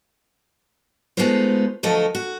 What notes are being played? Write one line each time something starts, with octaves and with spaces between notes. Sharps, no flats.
G#3 A3 B3 D#4 F4 C5
D2 F3 F#3 A3 A4 D#5
F#4